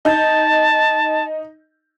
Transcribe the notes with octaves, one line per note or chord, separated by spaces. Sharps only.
D#4 A5 G6